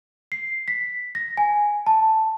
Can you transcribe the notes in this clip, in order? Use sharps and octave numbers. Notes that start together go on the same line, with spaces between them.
C7
B6
A#6
G#5
A5